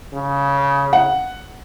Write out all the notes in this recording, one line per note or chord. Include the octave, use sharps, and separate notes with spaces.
C#3
F#5